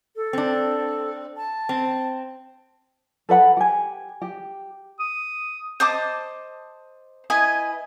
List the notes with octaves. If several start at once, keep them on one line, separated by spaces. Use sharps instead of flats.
A4
C4 D4
A5
C4
A4 B4 F#5 B5
G4 G#5
G4
D#6
C5 D#5 A5 D6
E4 B4 D#5 G#5